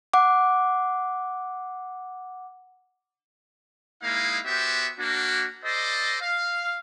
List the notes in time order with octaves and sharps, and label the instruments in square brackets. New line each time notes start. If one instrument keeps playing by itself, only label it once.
[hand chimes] F#5 D6
[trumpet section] G#3 A#3 D#4 E4 F5
B3 F#4 G4 C5 E5
A#3 D4 F#4
A4 C5 D5 D#5
F5